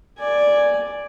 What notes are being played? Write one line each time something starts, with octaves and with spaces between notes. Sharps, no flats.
D5 G#5